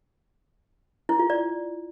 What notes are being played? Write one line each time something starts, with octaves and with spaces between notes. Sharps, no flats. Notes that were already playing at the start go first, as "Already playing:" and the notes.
E4
F4
D5